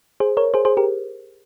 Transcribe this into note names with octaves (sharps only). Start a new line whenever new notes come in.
G#4 C5
A#4 C#5
G#4 C5
G#4 C5
G4 A#4